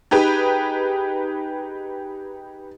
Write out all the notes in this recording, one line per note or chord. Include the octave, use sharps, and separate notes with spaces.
D#4 G4 G#4 B4